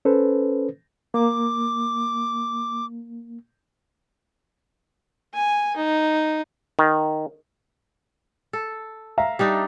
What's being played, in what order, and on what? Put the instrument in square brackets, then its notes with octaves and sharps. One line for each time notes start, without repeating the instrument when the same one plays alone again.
[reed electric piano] C#4 A4 B4 C5
[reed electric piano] A#3 [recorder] D6
[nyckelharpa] G#5
D#4
[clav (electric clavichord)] D#3
[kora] A4
[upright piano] E5 F5 A#5
[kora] G3 D4 D#4